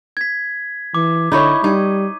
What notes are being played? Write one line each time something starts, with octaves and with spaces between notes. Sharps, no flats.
G#6 B6
E3 D6
D3 D#4 E4 C#5
G3 D#4